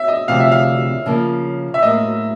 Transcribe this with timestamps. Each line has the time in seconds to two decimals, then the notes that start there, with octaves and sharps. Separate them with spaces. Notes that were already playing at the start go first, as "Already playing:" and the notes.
Already playing: E5
0.08 D#5
0.28 D2 C3 F3 F5
0.40 E5
0.51 F5
1.06 C#3 F3 A#3 C#4
1.74 E5
1.82 A2 F#3 A#3 D#5